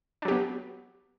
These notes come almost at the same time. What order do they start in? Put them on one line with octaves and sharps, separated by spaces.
D4 F#3 G4 B3